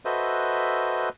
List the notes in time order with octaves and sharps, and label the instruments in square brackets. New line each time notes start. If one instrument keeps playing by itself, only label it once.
[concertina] F#4 A4 B4 C5 D#5 E5